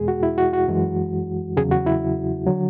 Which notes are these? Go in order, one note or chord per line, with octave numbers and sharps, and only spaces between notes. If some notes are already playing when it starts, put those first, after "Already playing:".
Already playing: E2 B2 G#3 G#4
F#4
E4
F#4
F#4
F#2 E3 G#3
E2 C#3 F#3 G#4
F#4
E4
D3 F#3